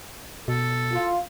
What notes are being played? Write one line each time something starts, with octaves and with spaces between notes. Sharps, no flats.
B2 A4
F4